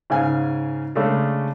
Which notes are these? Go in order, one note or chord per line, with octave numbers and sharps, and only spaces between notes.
G#2 C#3 F5 G#5
C#3 G#3 A3 C#4 D4 A4